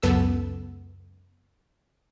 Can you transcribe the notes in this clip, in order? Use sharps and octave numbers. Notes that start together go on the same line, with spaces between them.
C#2 F#2 B3 A4 E6